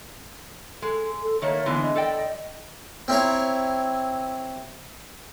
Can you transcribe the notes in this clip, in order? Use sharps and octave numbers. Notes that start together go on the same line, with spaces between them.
G#3 A4
A4
D#3 A3 A#3 C#5
D3 E3 G#3 B3
D#5
A4 D5 G5
C4 E4 C#5 A#5